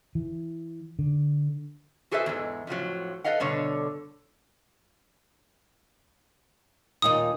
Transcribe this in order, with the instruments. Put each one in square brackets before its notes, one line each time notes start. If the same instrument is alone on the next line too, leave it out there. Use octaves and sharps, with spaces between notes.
[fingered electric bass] E3
D3
[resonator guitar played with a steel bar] F#4 G#4 A4 B4 C5 E5
E2 G#2 G3 G#3
F2 A2 F3 F#3
A4 B4 C#5 D#5 F5 F#5
G2 B2 D3 C#5
[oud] D#2 A#2 D#4 [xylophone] D#6